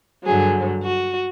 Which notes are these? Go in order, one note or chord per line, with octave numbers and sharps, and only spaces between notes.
G2 D3 F#3 G#4
F#4